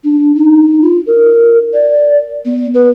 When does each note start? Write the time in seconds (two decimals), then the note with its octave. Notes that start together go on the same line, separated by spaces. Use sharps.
0.04 D4
0.35 D#4
0.82 F4
1.07 A#4
1.73 D5
2.45 B3
2.74 B4